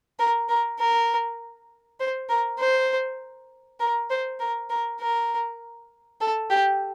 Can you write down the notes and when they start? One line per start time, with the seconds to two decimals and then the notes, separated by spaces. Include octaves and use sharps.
0.19 A#4
0.49 A#4
0.79 A#4
2.00 C5
2.29 A#4
2.59 C5
3.80 A#4
4.10 C5
4.40 A#4
4.70 A#4
5.00 A#4
6.21 A4
6.50 G4